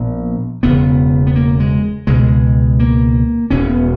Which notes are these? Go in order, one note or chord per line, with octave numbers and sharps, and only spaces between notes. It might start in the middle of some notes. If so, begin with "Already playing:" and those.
Already playing: A#1 A#2 B3
E1 E2 C#3 B3
B3
A#3
G#3
C#2 B2 G#3
A#3
E1 E2 B2 C#4
B3